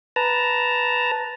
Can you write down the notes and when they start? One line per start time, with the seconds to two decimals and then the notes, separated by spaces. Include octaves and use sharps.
0.16 B4 A5 A#5